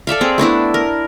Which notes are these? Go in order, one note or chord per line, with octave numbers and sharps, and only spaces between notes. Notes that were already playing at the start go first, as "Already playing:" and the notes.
A4 D5 E5 F5
C4 G#4
A3 B3 D4 E4
A#4